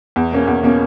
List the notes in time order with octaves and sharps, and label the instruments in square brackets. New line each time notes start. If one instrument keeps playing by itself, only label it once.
[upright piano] E2
B2 A#3 C#4
E2
B2 A#3 C#4